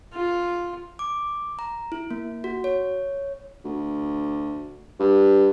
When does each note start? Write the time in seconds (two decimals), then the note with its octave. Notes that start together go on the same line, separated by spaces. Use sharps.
0.14 F4
0.99 D6
1.59 A#5
1.92 E4
2.11 A#3
2.44 F#4
2.64 C#5
3.64 D2
4.99 G2